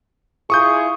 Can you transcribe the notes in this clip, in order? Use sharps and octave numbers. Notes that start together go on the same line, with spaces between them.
E4 F4 G#4 C#6 D#6 G6